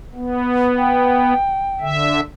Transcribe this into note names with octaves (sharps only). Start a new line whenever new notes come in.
B3
G5
D3 E5